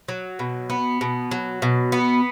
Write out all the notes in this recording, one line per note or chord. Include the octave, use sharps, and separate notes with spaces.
F#3
B2
B3
B2
F#3
B2
B3